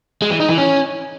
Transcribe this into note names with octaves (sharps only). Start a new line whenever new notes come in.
G#3
E3
D#4
E3
C#4